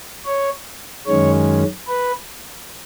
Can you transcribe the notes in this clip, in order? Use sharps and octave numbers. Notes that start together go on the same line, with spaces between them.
C#5
F#2 D#3 G#3 C#4 C#5
B4